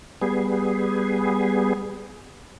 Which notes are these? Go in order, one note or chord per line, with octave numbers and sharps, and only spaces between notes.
G3 B3 G#4